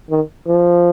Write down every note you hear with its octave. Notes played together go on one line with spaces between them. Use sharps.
D#3
F3